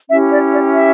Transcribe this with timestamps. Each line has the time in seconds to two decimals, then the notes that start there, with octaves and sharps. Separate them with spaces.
0.10 C#4 E4 G4 E5
0.31 D5
0.51 D5
0.72 E5